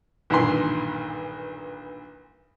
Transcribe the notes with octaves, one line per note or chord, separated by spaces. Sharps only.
B1 G2 A#2 D#3 E3 C6